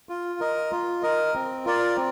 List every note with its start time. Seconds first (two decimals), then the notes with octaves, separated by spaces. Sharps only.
0.09 F4
0.40 A#4 D#5
0.72 F4
1.03 A#4 D#5
1.34 C4
1.65 F4 A#4 D5
1.96 C4